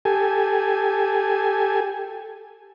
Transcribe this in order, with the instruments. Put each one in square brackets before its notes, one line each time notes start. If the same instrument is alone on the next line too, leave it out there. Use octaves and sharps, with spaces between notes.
[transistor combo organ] G4 A4 G#5